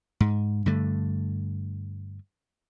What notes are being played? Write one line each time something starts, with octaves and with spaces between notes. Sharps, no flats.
G#2
G2 D3 A3